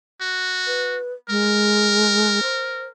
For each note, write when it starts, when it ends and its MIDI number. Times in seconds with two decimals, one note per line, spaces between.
0.21 0.98 66
0.67 1.13 71
1.29 2.40 56
1.29 2.90 70
2.43 2.86 72